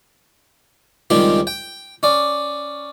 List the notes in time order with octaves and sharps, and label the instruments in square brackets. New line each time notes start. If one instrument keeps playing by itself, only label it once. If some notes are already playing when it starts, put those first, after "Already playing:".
[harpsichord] C#2 D#3 G3 G#3 C4 G4
G5
C#4 D5